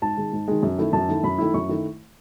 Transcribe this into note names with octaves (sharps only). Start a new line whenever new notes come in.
G#2 A5
D#3 G#3
G#2
D#3 G#3
F#2
D#3 A3 E4
F#2 A5
D#3 A3 E4
F#2 B5
D#3 A3 E4
F#2 C#6
D#3 A3 E4